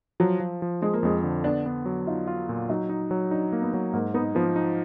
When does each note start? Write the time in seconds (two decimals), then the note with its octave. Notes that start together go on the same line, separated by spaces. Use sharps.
0.20 F3 F#3
0.40 F3
0.62 F3
0.82 F3 G#3
0.94 A#3
1.03 F2 G#3
1.24 D3
1.44 B3 D4
1.66 B3
1.86 F#3
2.07 D#4 F4
2.27 F4
2.49 A#2
2.69 F#3 D#4
2.89 D#4
3.11 F#3
3.31 D4 D#4
3.53 A#3
3.62 B3
3.74 F#3
3.93 G#2 A#3
4.14 B3 D#4
4.35 F3 B3
4.56 D#4